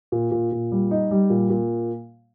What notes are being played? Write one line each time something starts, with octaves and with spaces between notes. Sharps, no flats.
A#2
A#2
A#2
G3
D#4
G3
A#2
A#2